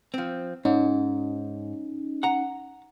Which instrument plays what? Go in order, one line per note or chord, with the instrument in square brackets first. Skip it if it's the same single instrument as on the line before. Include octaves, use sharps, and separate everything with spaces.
[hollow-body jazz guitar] F3 C4
[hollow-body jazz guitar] G#2 [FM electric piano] C#4 D#4
[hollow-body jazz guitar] F#5 A#5